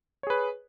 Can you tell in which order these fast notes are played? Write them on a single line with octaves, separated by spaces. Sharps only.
C#5 G#4 B4